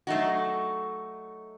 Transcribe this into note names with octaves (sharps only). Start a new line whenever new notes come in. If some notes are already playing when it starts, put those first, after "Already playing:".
F#3 A3 D#4 F#4